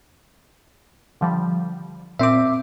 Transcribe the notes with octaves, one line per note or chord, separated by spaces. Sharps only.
D3 F3 G3
A#2 C4 E5 D6